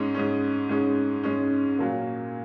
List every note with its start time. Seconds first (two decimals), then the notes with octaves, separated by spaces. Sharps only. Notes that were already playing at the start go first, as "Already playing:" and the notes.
Already playing: G#2 G#3 C#4
0.15 G#2 G#3 C#4
0.69 G#2 G#3 C#4
1.23 G#2 G#3 C#4
1.78 A#2 F#3 A#3